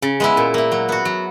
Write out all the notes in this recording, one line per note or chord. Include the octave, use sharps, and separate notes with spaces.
C#3
G#3 B3 E4
A#2
A#3 E4
F#3
B3 F#4
F#3